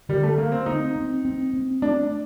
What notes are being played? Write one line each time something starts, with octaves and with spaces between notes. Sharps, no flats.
D3 G3
A3
A3 A#3
C4
C4 D#4
C4
C4
C4
A3 D4